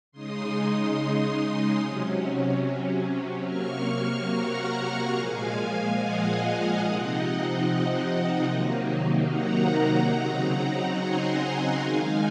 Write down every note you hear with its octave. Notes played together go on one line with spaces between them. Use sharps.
C#3 G#3 D#4 C6 D#6
C3 F#3 C#4
C3 F#3 A#3 C#6 F6
F#5 A#5
A#2 F3 G#3 F5 G#5
D#5 F#5
C3 F3 C4 D#4
C3 D#3 F#3 A#3 D#4
F#5 A#5
C#3 F#3 C4 D#4
G#5 C6
F#5 A#5
D#3 G#3 D#4 F5 G#5